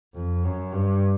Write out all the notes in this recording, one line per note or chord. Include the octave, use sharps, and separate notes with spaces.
F2
F#2
G2